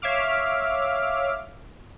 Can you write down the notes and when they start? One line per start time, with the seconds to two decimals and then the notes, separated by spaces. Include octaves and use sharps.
0.02 C#5 E5 F5 D6 F6